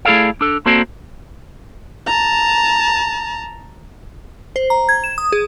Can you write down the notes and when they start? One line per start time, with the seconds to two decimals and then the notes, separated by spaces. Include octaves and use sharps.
0.05 A3 E4 G#4 A4 D5 F5
0.41 D4 A4
0.66 A#3 C4 F#4 A4 C5 D5
2.07 A5 A#5
4.56 C5
4.70 A#5
4.89 G#6
5.04 E7
5.18 D#6
5.32 G#4